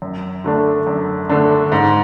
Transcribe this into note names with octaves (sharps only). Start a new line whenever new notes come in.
F#2
D3 A3 D4
F#2
D3 A3 D4
G#2